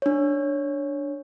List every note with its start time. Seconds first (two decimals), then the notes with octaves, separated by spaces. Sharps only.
0.02 D4 C#5